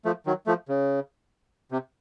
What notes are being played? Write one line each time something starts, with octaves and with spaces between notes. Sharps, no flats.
F3 A3
D#3 F#3
F3 A3
C#3
C3